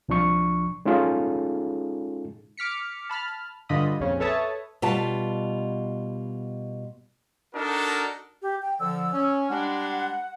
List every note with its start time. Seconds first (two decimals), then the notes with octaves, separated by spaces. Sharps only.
0.09 C2 F3 D4 C#6
0.85 G#3 C#4 D#4 F4 G#4 A4
2.57 D6 F6 B6 C#7
3.09 A5 B5 F6
3.69 G2 D3 F4 D#5 B5 D#6
4.00 A#1 F2 C#3 C#4
4.20 A4 B4 C#5 E5 A5 D#6
4.82 B2 G3 F4 G5 A5
7.55 D4 D#4 F#4 A4 A#4
8.42 G4
8.62 G5
8.80 D3 F3 E6
9.13 C#4
9.50 G3 G#3 D4 F#5